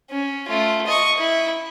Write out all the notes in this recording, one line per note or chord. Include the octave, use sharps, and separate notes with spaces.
C#4
A3 F4
D#5 C#6
E4